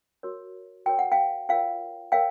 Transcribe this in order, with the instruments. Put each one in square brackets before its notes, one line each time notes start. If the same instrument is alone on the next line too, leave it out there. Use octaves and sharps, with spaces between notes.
[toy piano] F#4 A#4 C#5
F#4 A#4 C#5 G5
F#5
F5 G5
F4 A#4 C#5 F5 G5
A#4 C#5 F5 G5